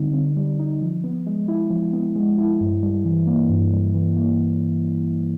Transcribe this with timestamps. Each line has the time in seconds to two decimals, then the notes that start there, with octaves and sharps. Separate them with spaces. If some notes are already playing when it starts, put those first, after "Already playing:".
Already playing: D3 G3 C4 D#4
0.13 C4
0.36 G3
0.59 D#4
0.82 F3
1.04 B3
1.26 G#3
1.48 E4
1.70 F3
1.93 B3
2.16 G#3
2.38 E4
2.60 G2
2.83 G3
3.05 E3
3.27 A#3
3.49 G2
3.72 G3
3.94 E3
4.17 A#3